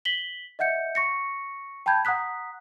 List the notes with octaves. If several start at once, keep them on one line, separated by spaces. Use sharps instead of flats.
B6 F#7 G7
D#5 E5 F#5 G6 C#7
C#6 A#6 C#7
G5 A5 B5 G6 G#6
F#5 A#5 D#6 F#6 B6